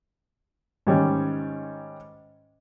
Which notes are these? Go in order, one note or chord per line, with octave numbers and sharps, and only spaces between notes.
G#2 D#3 G3 C#4